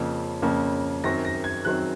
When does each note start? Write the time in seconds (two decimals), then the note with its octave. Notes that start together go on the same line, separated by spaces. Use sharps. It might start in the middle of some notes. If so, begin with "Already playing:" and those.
Already playing: F2 C#3 F3 A#3 C#4
0.42 F2 C#3 F3 A#3 C#4
1.03 F#2 D#3 F#3 C4 A#6
1.25 A#6
1.44 G#6
1.65 F#2 D#3 F#3 C4 F#6